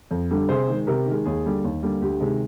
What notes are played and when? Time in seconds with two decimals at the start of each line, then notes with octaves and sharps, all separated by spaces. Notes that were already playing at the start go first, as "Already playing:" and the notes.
0.11 F2
0.31 D3 G3 D4
0.49 C3 G#4 C5
0.68 D#3 G#3
0.87 C3 G4 A#4
1.06 D#3 G#3
1.26 D#2 G#4
1.45 D3 G3 A#3
1.64 D#2
1.83 D3 G3 A#3
2.01 D2 G4
2.20 C3 D#3 G#3